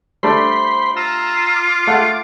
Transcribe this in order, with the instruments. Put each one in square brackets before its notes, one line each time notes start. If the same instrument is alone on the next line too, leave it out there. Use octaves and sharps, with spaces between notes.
[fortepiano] G3 A3 D4 [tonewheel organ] C5 B5 C6
[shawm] F4 [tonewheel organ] A#5 E6
[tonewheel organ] D6
[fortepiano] A3 F5 F#5